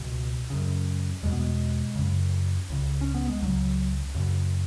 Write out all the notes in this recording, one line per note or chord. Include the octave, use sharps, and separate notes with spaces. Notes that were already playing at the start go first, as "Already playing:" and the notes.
Already playing: C#2 B2
F#2 C#3
E2 B2 G#3
B3
G#3
F#2 C#3
C#2 C#3
C#4
B3
G#3
C#2 C#3 F#3
F#2 C#3